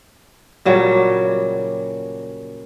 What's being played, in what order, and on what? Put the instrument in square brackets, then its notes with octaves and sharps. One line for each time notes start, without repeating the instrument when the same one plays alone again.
[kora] A#2 C#3 F#3 G3